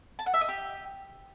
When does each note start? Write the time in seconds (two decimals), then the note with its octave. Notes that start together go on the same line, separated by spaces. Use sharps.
0.19 A5
0.26 F#5
0.34 E5
0.41 D#5
0.48 G4